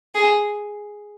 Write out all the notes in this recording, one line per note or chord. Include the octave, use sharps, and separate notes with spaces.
G#4